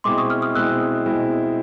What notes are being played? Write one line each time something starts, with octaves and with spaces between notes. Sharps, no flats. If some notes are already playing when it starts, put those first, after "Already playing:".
B2 G#3 C4 E4 C6 D6
C#6 D#6
D#6 F6
D#6 F6
B2 G#3 C4 E4 E6 F#6
B2 G#3 C4 E4